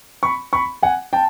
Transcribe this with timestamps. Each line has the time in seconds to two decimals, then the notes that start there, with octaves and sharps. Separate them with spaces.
0.23 B5 C#6
0.53 B5 C#6
0.83 F#5 G#5
1.13 G5 A5